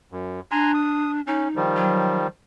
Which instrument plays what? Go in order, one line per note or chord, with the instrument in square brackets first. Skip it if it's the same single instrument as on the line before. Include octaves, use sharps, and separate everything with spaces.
[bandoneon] F#2
[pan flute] D4 [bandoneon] G#5 A#5 C6
[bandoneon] D#6
[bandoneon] C#4 [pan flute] D#4
[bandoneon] D#3 F3 G3
[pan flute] F#3